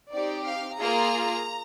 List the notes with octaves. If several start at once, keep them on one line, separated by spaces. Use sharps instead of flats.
C4 D#4 G4 D5
F5
A#3 F4 G#4 A#5